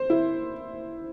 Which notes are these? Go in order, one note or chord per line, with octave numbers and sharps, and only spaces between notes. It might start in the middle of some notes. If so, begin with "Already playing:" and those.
Already playing: C5
E4